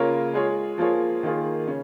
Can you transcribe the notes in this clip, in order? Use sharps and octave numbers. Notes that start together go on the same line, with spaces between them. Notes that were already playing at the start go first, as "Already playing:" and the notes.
Already playing: C#3 A#3 F4 A#4 C#5
G#3 F4 G#4 C#5
F3 A#3 F4 G#4 C#5
D#3 A#3 F4 G#4
C#3 C#4